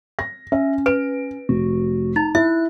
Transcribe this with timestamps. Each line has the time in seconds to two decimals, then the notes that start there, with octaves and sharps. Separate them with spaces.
0.19 A#6
0.52 C#4 E5
0.86 B4 D7
1.49 F1 F#4
2.16 D#4 A#5
2.35 E4 E5 F#6